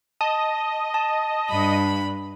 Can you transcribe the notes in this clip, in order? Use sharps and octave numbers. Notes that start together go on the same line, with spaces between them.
D#5 A5
A5
G2 B5